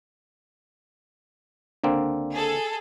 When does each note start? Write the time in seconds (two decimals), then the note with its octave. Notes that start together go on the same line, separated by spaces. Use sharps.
1.84 C#2 D3 A#3 C4 D4
2.32 G#4 A4